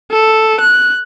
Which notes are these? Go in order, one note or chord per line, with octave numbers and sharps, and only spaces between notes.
A4
F#6